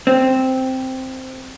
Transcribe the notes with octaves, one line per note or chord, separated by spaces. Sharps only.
C4